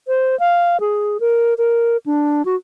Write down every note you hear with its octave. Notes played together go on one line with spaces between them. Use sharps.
C5
F5
G#4
A#4
A#4
D4
F#4